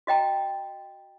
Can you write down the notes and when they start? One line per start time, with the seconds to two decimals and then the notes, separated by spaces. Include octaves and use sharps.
0.07 F#4 D#5 G5 A#5